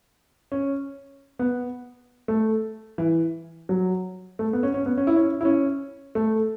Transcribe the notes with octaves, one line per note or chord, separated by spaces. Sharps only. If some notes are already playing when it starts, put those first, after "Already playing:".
C#4
B3
A3
E3
F#3
A3
B3
C#4
C#4
B3
C#4
E4
C#4
E4
C#4
A3